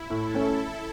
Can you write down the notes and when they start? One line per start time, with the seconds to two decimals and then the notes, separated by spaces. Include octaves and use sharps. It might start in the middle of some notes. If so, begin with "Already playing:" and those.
Already playing: E4
0.10 A2 A4
0.34 A3 C#4